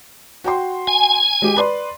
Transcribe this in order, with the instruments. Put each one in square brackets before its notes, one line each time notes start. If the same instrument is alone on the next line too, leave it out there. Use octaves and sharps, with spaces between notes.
[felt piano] F#4 G5 C6
[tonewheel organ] G#5
[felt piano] G#3 G4
B4 D5 C6